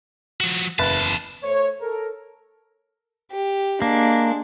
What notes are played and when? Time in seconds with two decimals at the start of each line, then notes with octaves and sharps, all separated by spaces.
0.41 F3 F#4
0.79 F#1 E2 B4 A5
1.44 A3 C5 C#5
1.80 A4 A#4
3.32 G4
3.82 G#3 A#3 D4